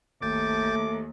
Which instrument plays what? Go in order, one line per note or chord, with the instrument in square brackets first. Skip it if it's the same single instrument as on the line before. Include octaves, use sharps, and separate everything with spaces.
[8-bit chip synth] G#1 G6 A6 [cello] D#2 [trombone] A3 [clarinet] D6